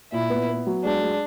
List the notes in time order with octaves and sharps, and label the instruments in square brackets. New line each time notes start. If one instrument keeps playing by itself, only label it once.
[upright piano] A#2 [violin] E4
[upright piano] B3
B3
F#3
[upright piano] G#3 [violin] D4
[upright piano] G#3